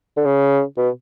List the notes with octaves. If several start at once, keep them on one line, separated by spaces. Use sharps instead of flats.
D3
C#3
B2